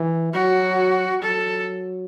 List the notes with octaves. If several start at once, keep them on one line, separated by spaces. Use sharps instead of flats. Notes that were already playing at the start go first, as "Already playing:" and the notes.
Already playing: E3
F#3 F#4
F#3 A4